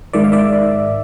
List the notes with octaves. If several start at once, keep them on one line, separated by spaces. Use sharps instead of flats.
G#2 D#3 D5 E5
F5
D5 E5